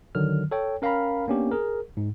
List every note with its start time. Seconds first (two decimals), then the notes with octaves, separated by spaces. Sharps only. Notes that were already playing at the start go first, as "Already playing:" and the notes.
0.15 D3 D#3 F#3 F6
0.51 A4 C#5 G5
0.82 C#4 A#4 F5 G5 A#5 B5
1.28 A#3 B3 C#4 D4 G4
1.51 G#4 A#4
1.97 G#2